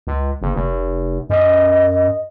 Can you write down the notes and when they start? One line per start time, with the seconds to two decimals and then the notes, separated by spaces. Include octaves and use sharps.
0.07 C#2
0.42 F#1
0.55 F1
1.30 F#2 D#5